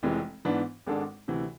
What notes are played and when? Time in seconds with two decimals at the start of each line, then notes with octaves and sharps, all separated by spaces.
0.03 F1 F2 C3 E3 G#3
0.45 G#2 E3 B3 D4
0.86 G#1 G#2 G#3 D4 A4
1.28 D2 C3 E3